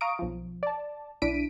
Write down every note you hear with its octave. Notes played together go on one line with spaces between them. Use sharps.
F5 A#5 C#6 D#6 D7
B1 F3
D5 A5
B1 D4 E4 B6 D7 D#7